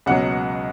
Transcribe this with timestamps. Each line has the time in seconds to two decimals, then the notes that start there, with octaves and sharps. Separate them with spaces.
0.06 C#2 B2 F#3 F#5